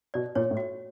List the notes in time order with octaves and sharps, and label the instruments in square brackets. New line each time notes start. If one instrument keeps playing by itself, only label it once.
[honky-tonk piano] B2 [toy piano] D5
[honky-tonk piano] A#2 [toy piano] C#5
[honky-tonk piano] A2
[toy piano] F#4